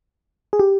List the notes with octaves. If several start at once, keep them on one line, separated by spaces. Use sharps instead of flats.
G#4
G4